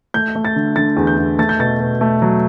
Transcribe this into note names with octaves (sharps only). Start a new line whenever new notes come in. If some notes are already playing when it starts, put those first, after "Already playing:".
A3 G6
A3
A6
D3
D3 A6
E2
G6
E2
A3 A6
G6
B2 A6
B2
A3
F#3